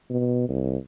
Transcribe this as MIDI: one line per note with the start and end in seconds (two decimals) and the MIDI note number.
0.10 0.48 47
0.49 0.76 36